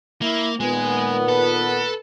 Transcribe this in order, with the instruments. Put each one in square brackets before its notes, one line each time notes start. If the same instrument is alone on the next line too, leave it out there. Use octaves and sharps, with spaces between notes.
[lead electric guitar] A#3 [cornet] E4
[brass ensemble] A#2 D#3 B3 [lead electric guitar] G#3 [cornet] G#5
[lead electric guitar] A4 [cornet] B4